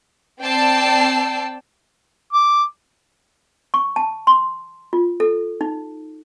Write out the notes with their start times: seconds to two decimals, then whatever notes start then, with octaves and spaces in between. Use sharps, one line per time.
0.42 C4 D5 G5 A5 E6 C7
2.33 D6
3.74 C#6
3.96 A5
4.27 C6
4.93 F4
5.20 A4
5.61 D#4